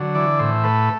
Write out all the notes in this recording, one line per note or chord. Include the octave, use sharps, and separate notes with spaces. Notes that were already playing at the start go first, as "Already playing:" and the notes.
Already playing: D3 F#3
E3 D5
A2 C5
A3 B4